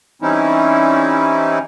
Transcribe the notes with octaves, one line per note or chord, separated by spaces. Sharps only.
E3 G3 C4 C#4 D#4 E4